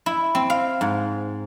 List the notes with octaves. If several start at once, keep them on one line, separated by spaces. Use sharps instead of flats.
E4
C4
F5
G#2